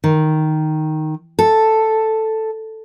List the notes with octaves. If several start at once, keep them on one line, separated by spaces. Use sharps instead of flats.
D#3
A4